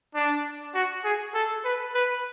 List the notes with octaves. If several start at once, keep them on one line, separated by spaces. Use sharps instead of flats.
D4
F#4
G#4
A4
B4
B4